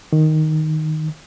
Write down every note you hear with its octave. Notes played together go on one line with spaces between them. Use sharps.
D#3